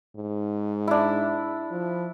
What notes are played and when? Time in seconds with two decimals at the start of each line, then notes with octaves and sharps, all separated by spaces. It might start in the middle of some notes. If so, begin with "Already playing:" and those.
0.16 G#2
0.88 D4 E4
1.71 F3